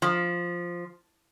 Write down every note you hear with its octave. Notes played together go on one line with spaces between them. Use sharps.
F3